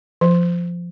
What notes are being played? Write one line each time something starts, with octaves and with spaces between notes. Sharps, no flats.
F3